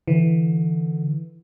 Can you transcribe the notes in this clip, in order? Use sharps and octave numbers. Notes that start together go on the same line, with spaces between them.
D3 E3